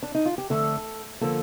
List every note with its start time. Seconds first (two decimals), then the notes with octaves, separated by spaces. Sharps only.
0.03 D4
0.15 D#4
0.26 F4
0.38 G4
0.50 F2 D3 A3 A4
1.21 D3 F3 A#3 A4